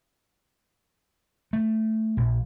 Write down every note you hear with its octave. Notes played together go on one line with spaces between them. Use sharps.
A3
A#1